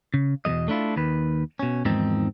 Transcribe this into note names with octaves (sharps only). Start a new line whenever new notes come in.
C#3
E2 B2 F3 G#3 D#5
A3 D4 E4 F4
D#2 D#3 B4
B2 C#4
E2 G#2 D#3 F3 C4 D#4